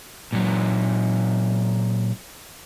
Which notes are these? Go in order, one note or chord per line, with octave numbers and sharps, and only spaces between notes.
A#2 F#3